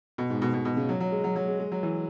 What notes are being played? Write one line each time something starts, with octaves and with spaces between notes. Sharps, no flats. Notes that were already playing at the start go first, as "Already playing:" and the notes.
B2
G#2
B2
B2
B2
C#3
F#3
F#3
G#3
F#3
F#3
G#3
G#3
F#3
E3